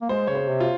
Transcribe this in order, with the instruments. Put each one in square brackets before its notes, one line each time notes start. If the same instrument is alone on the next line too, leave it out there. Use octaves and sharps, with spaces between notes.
[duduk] A#3
[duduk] G#3 [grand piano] C5
[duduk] C#3 [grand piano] C#5
[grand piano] C5
[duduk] C3
[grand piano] F4